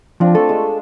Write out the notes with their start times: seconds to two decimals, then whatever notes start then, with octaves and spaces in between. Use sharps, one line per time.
0.20 F3 C4 D4 F4
0.35 A3 A4 C#6
0.49 G#3 D4 E6